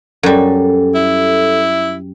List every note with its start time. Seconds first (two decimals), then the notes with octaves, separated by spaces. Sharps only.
0.23 F#2 G3 A4
0.95 E4